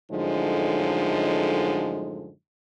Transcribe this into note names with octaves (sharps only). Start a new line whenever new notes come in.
F#2 A2 D3 F3 G#3 D#4